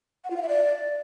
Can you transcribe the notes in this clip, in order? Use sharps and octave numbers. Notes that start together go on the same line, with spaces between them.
F#5
F4
F5
E5
D5